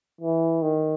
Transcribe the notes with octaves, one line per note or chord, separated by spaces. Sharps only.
E3
D#3